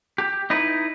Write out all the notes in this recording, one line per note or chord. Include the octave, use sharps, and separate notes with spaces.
G4
D#4 E4 B4